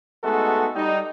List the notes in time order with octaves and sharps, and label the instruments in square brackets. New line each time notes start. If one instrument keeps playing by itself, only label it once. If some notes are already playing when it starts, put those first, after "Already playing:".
[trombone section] G#3 A3 B3 D#4 F#4 A4
G3 D#4